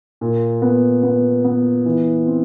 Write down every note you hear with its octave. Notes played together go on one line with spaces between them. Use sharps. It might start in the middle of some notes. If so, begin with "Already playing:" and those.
A#2
B3
B3
B3
E3
C4